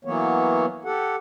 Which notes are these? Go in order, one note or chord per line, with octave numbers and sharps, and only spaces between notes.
E3 F#3 A#3 B3 C#5
G4 A4 F#5